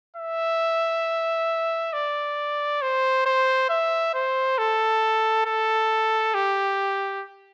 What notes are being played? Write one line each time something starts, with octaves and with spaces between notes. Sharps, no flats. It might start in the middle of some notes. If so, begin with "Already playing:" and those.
E5
D5
C5
C5
E5
C5
A4
A4
G4